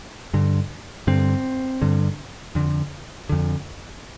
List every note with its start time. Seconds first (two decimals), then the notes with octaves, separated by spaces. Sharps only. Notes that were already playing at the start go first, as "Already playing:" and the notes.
0.34 G2 D3
1.07 G2 D3 C4
1.81 G2 D3
2.55 F2 D3
3.29 F2 D3